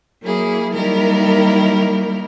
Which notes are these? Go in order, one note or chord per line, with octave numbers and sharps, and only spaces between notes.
F#3 A#3 E4 G#4
D#3 F#3 G3 A#3 E4 A#4